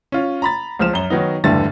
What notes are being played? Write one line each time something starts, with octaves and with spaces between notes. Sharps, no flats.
C#4 F4
A#5 B5 A6
C#2 F3 F6 E7
F#2 G7
D#3 F#3 B3 D#4
E1 D2 G2 D3 E3 A6